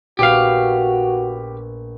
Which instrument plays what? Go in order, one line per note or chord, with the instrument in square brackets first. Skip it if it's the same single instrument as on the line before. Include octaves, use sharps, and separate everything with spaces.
[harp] A#1 B3 [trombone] F#4 [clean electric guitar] G4 F5